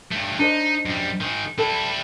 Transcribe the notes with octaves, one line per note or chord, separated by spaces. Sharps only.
G2 A3
D4 D#4 C5 D#5
F#2 G3
D#3 G#4
G3 E4 A4